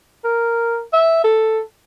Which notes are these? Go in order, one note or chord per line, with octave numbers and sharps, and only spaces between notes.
A#4
E5
A4